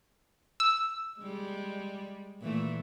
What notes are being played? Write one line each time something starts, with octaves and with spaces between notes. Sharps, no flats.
E6
G3 G#3
A#2 E3 A3